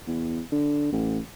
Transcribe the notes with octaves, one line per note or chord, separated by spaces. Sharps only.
E2
D3
A1